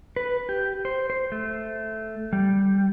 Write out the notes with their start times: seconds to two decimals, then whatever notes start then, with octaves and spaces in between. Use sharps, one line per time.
0.16 B4
0.49 G4
0.85 C5
1.10 C5
1.32 A3
2.33 G3